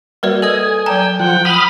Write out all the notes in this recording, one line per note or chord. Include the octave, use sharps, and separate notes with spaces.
G3 A#3 F#4 A#4 B4 D5
A4 D#5 G#5 D#6 G#6
F#3 G5 A5 A#5
F3 F#5 G5
B5 D#6 F6 F#7